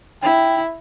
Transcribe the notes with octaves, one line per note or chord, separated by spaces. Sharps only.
E4 G5